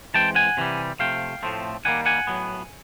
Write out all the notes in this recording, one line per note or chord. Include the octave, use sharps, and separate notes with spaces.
E3 G#3 C4 G5 A5
F#5 G#5
C3 E3 G3
C3 F3 A3 F5 G5
A2 F3 A3 C4
D#3 G3 A#3 F#5 G#5
F#5 G#5
A2 F#3 B3